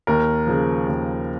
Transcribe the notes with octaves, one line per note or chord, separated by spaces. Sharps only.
D#2 A#4
C#3 F3
D#2